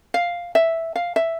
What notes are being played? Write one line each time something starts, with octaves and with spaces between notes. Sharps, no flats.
F5
E5
F5
E5